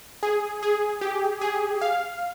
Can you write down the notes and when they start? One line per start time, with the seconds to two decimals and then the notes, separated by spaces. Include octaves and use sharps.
0.23 G#4
0.63 G#4
1.01 G4
1.41 G#4
1.81 F5